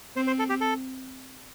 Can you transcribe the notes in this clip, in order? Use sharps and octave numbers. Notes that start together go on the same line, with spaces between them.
C4 C5
C5
A4
G4
A4